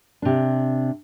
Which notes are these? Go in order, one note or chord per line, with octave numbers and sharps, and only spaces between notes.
C3 D4